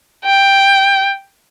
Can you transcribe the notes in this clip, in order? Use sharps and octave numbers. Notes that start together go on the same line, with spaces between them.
G5